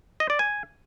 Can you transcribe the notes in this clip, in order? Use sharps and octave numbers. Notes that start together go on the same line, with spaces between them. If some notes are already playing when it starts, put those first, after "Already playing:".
D#5
D5
G#5